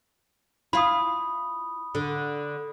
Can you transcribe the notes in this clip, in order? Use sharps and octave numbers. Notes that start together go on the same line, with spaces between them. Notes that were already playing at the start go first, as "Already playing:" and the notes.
E4 F4 B5 D#6
D3